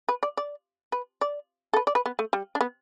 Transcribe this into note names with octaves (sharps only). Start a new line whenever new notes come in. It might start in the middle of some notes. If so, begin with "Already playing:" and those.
B4
D5
D5
B4
D5
A4
B4
D5
B4
B3
A3
G3
D4
B3